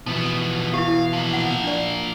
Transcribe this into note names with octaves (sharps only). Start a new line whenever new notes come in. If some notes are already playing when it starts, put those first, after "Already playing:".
B2 E3 F3 B3
E4 G4 F5
F3 A#3
F#5
D4 D5